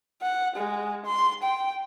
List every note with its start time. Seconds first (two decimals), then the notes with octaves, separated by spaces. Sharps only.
0.22 F#5
0.56 G#3
1.05 C6
1.43 G5